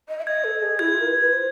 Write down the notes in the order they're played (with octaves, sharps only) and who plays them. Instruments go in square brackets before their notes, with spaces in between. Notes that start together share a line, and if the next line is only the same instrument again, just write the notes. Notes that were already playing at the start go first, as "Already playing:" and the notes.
[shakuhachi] D#5
E5
[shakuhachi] D#5 [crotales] G#6
[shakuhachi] A4
G#4
[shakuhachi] E4 [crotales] G#6
[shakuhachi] F4
A#4
B4
B4
C5